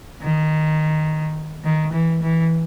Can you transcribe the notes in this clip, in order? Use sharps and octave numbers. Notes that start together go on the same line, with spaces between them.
D#3
D#3
E3
E3